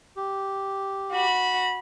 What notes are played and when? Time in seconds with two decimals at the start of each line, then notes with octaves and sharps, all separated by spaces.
0.16 G4
1.13 F#4 B5